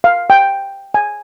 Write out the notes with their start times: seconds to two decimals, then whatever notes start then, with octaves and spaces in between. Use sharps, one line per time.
0.04 F5
0.30 G5
0.94 G#5